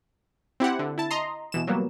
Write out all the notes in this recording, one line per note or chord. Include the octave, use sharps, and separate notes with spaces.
C4 E4 G4 F#5
D3
E4 A5
D#5 A#5 C6
B2 E3 E7
F#3 G3 A#3 B3